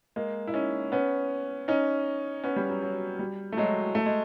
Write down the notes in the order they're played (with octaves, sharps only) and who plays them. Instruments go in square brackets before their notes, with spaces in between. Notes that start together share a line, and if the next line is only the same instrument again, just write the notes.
[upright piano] G#3 A#3
E4
C#4 D#4
B3 C#4
C#4 D#4
B3 C#4
G3
F#3
F#3
G3
A3
F#3 G#3
A3
G#3